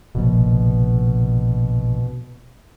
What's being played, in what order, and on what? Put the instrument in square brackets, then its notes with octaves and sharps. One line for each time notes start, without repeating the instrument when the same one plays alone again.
[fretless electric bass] F1 A#1 [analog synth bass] B2